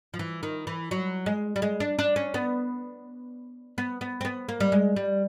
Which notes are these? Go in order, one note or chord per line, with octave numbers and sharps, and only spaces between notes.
F3
E3
D#3
E3
F#3
G#3
G3
G#3
D4
D4
C#4
B3
B3
B3
C4
B3
A#3
G3
G#3
G3